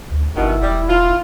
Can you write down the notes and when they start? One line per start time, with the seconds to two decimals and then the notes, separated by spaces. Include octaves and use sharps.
0.11 D2
0.36 G1 G2 B2 D#3 E4
0.63 E1 G3
0.89 F4